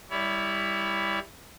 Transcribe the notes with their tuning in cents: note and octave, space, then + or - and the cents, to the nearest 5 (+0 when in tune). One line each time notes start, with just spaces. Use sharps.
G3 +20 E4 +0 C#5 +40